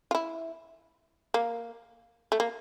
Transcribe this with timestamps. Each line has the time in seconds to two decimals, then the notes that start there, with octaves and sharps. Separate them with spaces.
0.11 F4
0.15 E4
1.34 A#3
2.32 A3
2.40 A#3